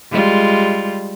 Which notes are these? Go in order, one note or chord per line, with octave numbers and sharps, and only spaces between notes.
G3 G#3 F4